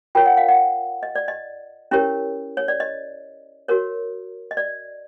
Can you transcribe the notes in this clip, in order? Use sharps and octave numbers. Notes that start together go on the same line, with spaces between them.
F4 A#4 C#5 G5
F#5
F5
F#5
D#5
D5
D#5
C#4 E4 G4 A#4 C#5
C#5
D5
D#5
F#4 A#4 C#5
D#5
D5